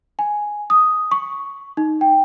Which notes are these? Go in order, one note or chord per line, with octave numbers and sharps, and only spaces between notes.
G#5
D#6
C#6
D#4
G5